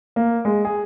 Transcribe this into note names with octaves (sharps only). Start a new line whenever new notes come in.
A#3
G#3
G#4